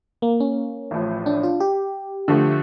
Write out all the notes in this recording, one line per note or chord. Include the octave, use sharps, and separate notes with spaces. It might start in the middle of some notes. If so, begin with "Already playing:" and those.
A#3
C#4
A1 A2 F3
D4
F4
G4
D3 F3 A3